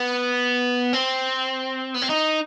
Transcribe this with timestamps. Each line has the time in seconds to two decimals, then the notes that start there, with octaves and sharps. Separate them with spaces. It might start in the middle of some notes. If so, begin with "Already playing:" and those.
Already playing: B3
0.93 C4
1.95 B3
2.02 C4
2.10 D#4